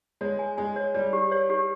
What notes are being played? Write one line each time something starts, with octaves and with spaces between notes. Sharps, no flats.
G#3 C#5
G#5
G#3 G#5
C#5
G3 C#5
G4
C#5
G4